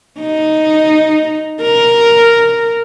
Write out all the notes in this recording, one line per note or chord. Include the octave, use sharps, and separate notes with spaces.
D#4
A#4